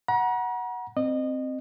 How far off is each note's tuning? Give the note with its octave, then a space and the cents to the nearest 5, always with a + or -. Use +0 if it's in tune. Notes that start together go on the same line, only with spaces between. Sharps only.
F#5 +0 A#5 +40
C4 +0 D#5 -25